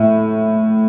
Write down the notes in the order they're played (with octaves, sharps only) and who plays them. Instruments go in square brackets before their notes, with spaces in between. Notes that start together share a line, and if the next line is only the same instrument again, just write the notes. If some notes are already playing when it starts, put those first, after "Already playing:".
Already playing: [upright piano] A2